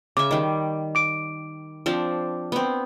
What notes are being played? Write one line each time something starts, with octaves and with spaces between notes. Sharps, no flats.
C#3 E5 D6
D#3 G3
D6 D7
F3 C4 D4
B3 C4